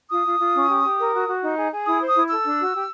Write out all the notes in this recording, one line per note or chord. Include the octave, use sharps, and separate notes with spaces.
F4 D#6
F4
F4
C#4
G4
G4
A#4
F#4
F#4
D#4
G#4
G#4
E4 D#6
C5
D#6
E4
A4 E6
D4
F#4
G4